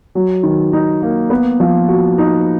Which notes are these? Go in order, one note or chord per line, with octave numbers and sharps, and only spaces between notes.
F#3
D#3
D#4
A#3
B3
F3
F#4
D#4